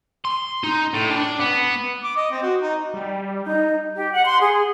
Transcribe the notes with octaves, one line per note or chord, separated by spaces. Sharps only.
C6
D#4
A2
D4
B3
D6
D#5
C4
F#4
D#4
G3
D#4 D#5 G6
G4
F#5
C6
G#4